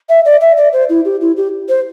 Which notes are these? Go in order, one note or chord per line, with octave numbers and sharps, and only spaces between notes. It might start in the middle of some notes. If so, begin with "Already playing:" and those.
E5
D5
E5
D5
C5
E4
G4
E4
G4
C5